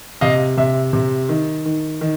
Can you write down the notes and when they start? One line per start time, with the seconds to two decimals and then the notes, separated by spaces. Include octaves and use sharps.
0.21 C3 D#5 F5
0.57 C3 E5
0.93 C3
1.29 D#3
1.65 D#3
2.01 D#3